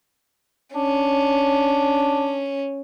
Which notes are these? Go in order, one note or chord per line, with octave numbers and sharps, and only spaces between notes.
C#4 D4